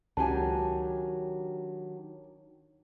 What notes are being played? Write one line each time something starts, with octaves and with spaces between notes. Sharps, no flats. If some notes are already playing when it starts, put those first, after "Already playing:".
C#2 D#3 F#3 D4 G4 G#5 A5